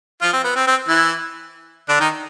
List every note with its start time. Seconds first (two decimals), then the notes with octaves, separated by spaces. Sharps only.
0.22 F3 F4
0.33 C4
0.44 B3
0.56 C4
0.67 C4
0.88 E3 E4
1.88 D3 D4
2.00 D#3 D#4